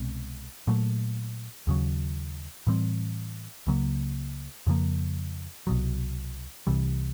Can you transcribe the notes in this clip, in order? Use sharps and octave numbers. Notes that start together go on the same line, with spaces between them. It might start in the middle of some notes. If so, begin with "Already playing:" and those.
Already playing: C2 B2 G#3 C4
A#2 F#3 A3
D#2 C#3 F#3
A2 E3 G3 C4
C#2 C#3 F#3 A#3
F2 C#3 F3 A#3
C2 B2 F#3
C2 C3 E3 G3